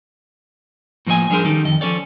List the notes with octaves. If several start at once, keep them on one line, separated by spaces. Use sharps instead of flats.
A2 F3 A#3 A#4 D#5 G#5
F3 G3 D4 G#4 A#4 C5
D#3 G3 C#4 D#4 G4 A4
F2 D#3 D#5
F3 C#4 A4 C#5 D5